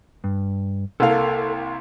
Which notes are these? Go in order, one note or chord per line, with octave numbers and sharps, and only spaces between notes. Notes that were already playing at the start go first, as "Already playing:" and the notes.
G2
C2 A#3 A4 F5 F#5 A5